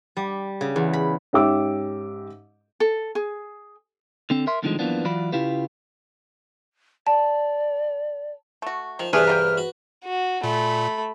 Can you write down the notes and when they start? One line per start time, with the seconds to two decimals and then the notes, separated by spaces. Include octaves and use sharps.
0.17 G3
0.61 C#3
0.76 E2
0.93 B5
1.33 G#2 C#4 G4 E5 D6 E6
2.80 A4
3.15 G#4
4.30 D3 C4 A4
4.47 A#4 E5 C6
4.63 E2 A2 D3 D#3 F3 G#3
4.79 F#2 E3 F3 A#3 B3 D4
5.05 E3 F#3 F4 D5 B5
5.32 C#3 E4 F4 G4 B4
7.07 D5 A5
8.62 A3 F#4
8.99 D#3 F3
9.13 E2 G2 C3 A3 D4 G#4 B4 F6
9.27 A#3 F4 G5
9.57 F#4
10.04 F#4
10.44 A#2 A3 B5